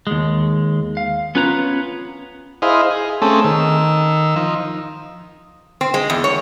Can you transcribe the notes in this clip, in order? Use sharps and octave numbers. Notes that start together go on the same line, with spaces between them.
D#2 G#3
F5
B3 C#4 F4 B4 C#5 A#5
E4 G#4 C5 D#5 F5
G#4
A3 C4 C#4 G#4 A4
D#3 E6
F3 D#4
C4
G#3
E2
C#5